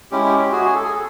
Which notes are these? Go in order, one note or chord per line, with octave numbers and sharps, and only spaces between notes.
G#3 C#4 E4 G4
G4
G4
F#4 G#4
G#4
A4
G#4
A4